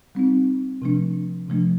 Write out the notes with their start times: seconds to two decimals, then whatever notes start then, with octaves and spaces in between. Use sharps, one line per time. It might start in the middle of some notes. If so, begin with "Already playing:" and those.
0.15 G3 C4 D#4
0.82 C3 F3 A3 D4
1.48 C3 F3 A3 D4